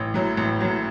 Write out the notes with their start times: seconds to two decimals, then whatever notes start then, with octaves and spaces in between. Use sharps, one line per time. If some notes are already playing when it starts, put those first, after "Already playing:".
Already playing: A1 C#5
0.14 A2 F#3
0.37 A1
0.60 A2 F#3